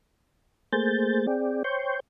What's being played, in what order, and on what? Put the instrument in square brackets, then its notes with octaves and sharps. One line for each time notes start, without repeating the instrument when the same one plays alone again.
[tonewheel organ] A3 A#3 G#4 C5 G6 A6
C4 G#4 D5 G5
C5 C#5 G5 C6 C#6 G6